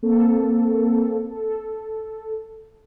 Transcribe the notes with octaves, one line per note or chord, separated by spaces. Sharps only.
A#3 C4 A4
A4